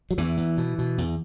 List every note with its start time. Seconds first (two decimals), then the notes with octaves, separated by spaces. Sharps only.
0.11 F#3
0.18 E2 E3
0.37 E2
0.58 B2
0.78 B2
0.98 E2